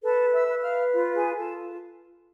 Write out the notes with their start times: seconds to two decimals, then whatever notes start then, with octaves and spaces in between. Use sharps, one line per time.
0.04 A4 B4 A5
0.33 E5 E6
0.48 B4
0.63 F5 F6
0.93 F4
1.15 G#4 G#5
1.37 F4 A4 A5